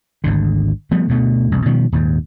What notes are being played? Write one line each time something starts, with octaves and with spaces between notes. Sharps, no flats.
G#1 D2 D3
F3 G3 A3 B3
D2 B2 A3
E1 C2
B2 D#3 F3 G3
D#1 D#2 G#2